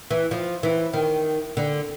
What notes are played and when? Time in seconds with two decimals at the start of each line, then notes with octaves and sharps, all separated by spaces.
0.11 E3
0.31 F3
0.63 E3
0.93 D#3
1.57 D3